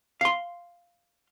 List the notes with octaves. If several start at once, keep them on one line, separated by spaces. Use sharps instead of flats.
F5 C6